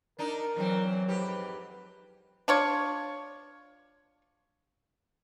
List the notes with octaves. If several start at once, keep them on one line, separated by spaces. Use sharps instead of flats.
D4 D#4 A#4
E2 E3 F#3 C4
F2 G#2 G4 B4
D4 F4 C#5